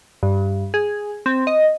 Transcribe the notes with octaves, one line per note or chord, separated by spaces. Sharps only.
G2
G#4
C4
D#5